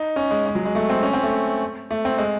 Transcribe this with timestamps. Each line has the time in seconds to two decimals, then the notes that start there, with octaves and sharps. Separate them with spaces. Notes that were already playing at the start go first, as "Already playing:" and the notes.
Already playing: D#4
0.16 C#4
0.31 G#3
0.46 G#3
0.55 F#3
0.66 G#3
0.75 A3
0.90 C4
1.03 C#4
1.13 C4
1.23 A3
1.91 A3
2.05 C4
2.18 G#3